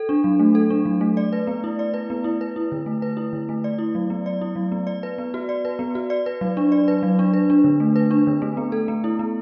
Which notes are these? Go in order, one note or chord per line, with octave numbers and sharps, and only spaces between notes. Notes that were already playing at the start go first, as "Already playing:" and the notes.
Already playing: A4
D4
F#3
A3
A4
D4
F#3
A3
D5
B4
B3
E4
D5
B4
B3
E4
B4
E4
D3
A3
B4
E4
D3
A3
D5
E4
F#3
B3
D5
E4
F#3
B3
D5
B4
B3
F#4
D5
B4
B3
F#4
D5
B4
F#3
D4
D5
B4
F#3
D4
B4
D4
D3
A3
B4
D4
D3
A3
B3
A4
B3
E4
B3